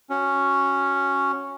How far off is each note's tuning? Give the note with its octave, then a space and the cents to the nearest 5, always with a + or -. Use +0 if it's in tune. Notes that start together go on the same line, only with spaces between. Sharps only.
C#4 +0 F#4 +0